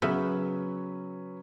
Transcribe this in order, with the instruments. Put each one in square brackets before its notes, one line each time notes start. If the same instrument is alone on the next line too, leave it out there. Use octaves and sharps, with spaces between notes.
[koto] C#3 B3 E5 [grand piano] F#3 C#4 B4